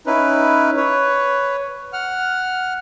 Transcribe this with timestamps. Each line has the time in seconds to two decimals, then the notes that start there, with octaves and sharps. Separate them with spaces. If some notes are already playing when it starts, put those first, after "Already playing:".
0.06 C#4 D#4 E4 B4
0.77 B4 C#5
1.93 F#5 F6